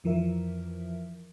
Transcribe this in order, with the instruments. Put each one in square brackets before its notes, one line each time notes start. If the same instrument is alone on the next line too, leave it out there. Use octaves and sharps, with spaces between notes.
[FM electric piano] F2 E3 F3 A#4 E5